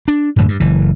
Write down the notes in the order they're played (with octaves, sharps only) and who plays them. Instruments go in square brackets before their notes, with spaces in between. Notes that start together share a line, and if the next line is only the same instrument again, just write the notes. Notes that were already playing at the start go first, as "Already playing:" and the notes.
[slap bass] D4
F#2 A2 D3 E3
G2
F#1 E3